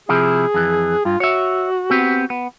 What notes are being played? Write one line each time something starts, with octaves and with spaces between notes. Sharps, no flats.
C3 F3 E4 G#4
F2 E3
G2 F4
F#4 C#5 E5
B3 C4 G4
B3